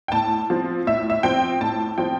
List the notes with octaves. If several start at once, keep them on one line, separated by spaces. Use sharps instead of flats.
G5
A2 A5
F3 C4
A2 E5
E5
F3 C4 G5
A2 A5
F3 C4 G5